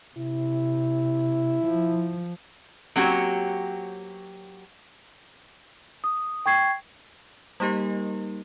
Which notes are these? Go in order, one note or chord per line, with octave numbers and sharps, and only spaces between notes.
C3 E4
F3
F#3 A#3 C4 C#4 F#4 G4
D#6
G5 C#6 G#6 C7
G3 A#3 D#4 G4 A#4 D#5